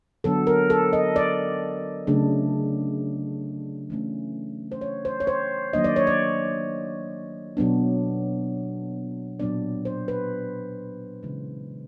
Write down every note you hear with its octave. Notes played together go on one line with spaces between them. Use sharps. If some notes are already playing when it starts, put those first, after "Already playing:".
D3 F#3 B3 D4 A4
A#4
A4
D#5
D5
C#3 F#3 A3 D4
E3 A3 C#4
C5
C#5
C5
C#5
C5
D#3 F#3 A#3 D4 D#5
D5
C#5
D5
B2 F#3 B3 D4
A#2 F#3 B3 D4 D5
C5
B4
C#3 E3 G#3